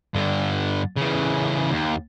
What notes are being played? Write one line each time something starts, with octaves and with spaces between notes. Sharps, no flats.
G2 D3
C#3 E3
D#2